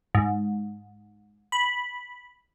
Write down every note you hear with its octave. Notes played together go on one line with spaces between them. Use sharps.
G#2
B5